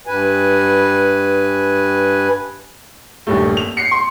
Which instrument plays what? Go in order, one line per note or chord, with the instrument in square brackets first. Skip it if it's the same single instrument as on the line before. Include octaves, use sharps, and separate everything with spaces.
[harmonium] G2 B4 G#5
[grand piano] D#1 G2 A3
F7
C7 C#7
C6